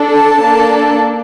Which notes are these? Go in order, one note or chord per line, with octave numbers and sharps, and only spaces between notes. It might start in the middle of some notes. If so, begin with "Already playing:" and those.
Already playing: D4 A4
A5
A#3 D4 A4